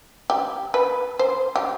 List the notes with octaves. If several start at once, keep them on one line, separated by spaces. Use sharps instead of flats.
G4
B4
C5
G4